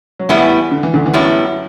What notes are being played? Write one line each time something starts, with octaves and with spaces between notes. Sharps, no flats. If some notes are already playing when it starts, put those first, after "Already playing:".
F#3
E2 A2 E3 G3 B3 E4
D3
E3
D2 D3
E3
F#2 A2 F#3 G3 B3 E4